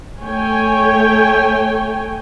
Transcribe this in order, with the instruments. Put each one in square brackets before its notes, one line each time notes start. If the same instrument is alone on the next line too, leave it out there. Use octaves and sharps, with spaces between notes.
[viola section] A3 C#5 G5 G#5